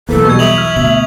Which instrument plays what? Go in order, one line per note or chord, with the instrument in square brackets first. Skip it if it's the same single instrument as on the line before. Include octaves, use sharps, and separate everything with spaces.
[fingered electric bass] B1 E2 [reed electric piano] A#3 B4 [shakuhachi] A4
[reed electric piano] B2 G3 [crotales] C#6 G#6
[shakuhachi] E5 [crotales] D#6 F7 F#7
[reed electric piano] E6 F6
[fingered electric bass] D2 B2 [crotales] F#7